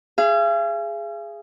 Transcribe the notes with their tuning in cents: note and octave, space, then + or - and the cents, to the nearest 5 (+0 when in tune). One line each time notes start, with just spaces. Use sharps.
G#4 +0 F5 -45